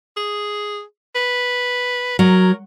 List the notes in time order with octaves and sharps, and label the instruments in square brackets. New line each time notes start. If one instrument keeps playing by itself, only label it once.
[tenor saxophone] G#4
B4
[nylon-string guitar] F#3 [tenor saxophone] A#4